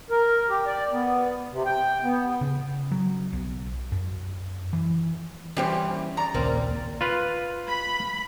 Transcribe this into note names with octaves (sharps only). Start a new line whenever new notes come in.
A#4
G4
D5
B3
C3
G5
B3
C#3
F#3
B1
F#2
E3
E3 G3 C#4 G4 C5
D5 A#5
A#1 D#2 C#3 A#3 C4
F4 B4
B5